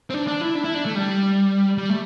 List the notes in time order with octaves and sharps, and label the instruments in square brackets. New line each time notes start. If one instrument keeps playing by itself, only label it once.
[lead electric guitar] C4
D4
D4
E4
D4
E4
D4
A3
G3
G3
A3